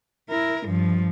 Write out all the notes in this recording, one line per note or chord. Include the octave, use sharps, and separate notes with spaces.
E4 A#4
G2 F3